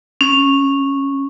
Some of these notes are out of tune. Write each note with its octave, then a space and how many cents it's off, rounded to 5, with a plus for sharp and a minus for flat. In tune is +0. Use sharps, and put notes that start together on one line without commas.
C#4 -10